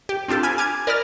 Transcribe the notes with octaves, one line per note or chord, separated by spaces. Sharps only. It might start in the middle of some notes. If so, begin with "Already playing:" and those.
G4
C4 D4 F4 G4 A4
G#5 B5 F6
G#5 D6 F6 G#6
A#4 D5 B5 D#6 F6 A6